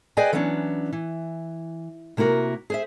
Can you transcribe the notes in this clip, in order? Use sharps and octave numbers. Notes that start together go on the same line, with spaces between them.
G#4 B4 D5 D#5 G5 G#5
E3 F#3 B3 C#4 D4
E3
C3 A#3 E4 F#4 A#4
G#4 C5 E5